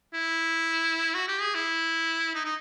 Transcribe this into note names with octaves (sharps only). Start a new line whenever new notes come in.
E4
F#4
G4
G#4
E4
D#4
D#4